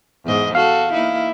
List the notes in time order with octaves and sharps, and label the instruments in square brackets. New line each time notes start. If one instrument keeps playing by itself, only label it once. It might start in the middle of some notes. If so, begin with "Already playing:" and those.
[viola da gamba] E2 G#2 D#5
[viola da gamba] F#4 A4 [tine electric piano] F5
[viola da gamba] A#3 D#4 E4